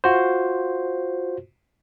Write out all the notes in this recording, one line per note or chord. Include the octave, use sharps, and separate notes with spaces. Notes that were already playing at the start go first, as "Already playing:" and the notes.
F4 F#4 C5